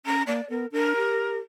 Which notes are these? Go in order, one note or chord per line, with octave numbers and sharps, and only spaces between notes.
C#4 A#5
A#3 D5
B3 A#4
D4 A#4
G4